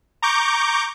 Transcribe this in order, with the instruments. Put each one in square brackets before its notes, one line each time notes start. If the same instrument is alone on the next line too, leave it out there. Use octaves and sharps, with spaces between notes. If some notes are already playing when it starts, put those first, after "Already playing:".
[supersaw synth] A#5 C#6 D6 G6